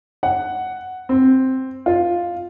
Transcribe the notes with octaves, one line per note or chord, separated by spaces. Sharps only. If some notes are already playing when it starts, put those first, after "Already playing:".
F#5
C4
F4